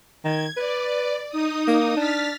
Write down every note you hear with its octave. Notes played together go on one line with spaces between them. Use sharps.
D#3 G#6
B4 D5
D#4 D#6
A#3
D4 F6 A6 B6